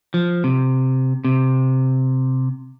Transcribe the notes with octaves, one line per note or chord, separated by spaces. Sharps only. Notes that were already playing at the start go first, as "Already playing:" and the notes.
F3
C3
C3